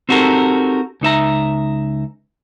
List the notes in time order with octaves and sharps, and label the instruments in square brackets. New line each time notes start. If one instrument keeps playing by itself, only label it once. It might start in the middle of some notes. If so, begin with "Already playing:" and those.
[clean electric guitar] C4 D#4 F#4 G4 A4 A#4
C#2 D#4 E5 A#5